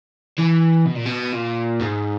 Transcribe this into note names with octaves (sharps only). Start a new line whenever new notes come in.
E3
B2
A#2
B2
A#2
G#2